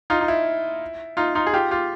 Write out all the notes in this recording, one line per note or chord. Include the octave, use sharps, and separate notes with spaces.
D#4 F4
D#4
E4
D#4 F4
D#4 F4
G#4
F4 G4
F4 G4